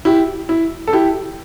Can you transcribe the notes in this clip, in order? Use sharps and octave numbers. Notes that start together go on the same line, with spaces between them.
E4 G4
E4
A4
E4 G4